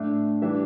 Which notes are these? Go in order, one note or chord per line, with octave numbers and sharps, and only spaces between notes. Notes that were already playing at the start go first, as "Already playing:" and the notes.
Already playing: A2 A3 D4
E3 G3 D4 E5